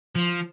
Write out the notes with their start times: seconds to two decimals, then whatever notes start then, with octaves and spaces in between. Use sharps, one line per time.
0.15 F3